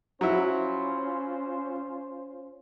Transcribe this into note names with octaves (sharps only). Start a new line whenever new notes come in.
F#3 C#4 E4 F4 C5